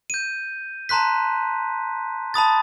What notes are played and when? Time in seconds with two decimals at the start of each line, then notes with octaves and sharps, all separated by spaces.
0.10 G6 D#7
0.89 A5 A#5 C6 F#6 B6
2.34 A5 B5 D#6 A6